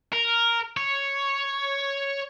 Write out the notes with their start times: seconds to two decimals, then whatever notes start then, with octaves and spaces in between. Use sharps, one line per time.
0.13 A#4
0.77 C#5